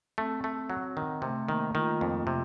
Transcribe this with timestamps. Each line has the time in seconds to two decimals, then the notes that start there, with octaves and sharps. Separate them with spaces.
0.18 A3 C4
0.44 A3
0.70 F#3
0.97 D#3
1.22 C3 A3
1.48 D#3 A#3
1.75 D#3 F4
2.01 F2
2.27 C3